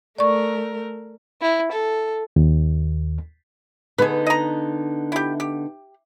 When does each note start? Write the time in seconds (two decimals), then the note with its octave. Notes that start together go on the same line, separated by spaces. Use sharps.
0.19 A3 A#4 D5 C#6
1.41 E4
1.72 A4
2.36 D#2
3.98 D3 B3 D#4 G#4 B4
4.27 D#5 A#5
5.12 E4 G4
5.40 G4